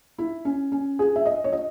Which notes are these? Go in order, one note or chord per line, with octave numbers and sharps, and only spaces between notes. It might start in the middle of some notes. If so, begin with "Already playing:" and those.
E4
C#4
C#4
G#4
E5
D#5
C#5
D#5